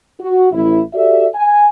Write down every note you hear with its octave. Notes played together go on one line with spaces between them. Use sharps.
F#4
A1 E4
F#4 G4 A4 D5 E5
G#5